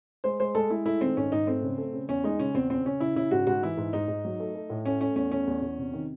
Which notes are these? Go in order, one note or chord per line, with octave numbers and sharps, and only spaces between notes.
G#3 C5
G#3 C5
G#3 A4
G#3 E4
A3 E4
D#3 C4
G#2 C#4
G#2 D#4
A3 C4
C#3
A3
C#3
E2 C#4
G#3 D#4
C#3 C#4
E2 C4
C#3 C4
C#3 C#4
C#3 E4
C#3 E4
G#2 F#4
G#2 F#4
E3 E4
G#2
G#2 D#4
G#2
F#3
A3
A3
A2
A3 C#4
A3 C#4
E2 C#4
A3 C#4
E2
E2
C3
D#3